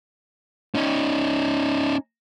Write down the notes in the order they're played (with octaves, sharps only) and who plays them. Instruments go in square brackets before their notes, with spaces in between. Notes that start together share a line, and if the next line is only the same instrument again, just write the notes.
[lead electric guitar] C#4 D#4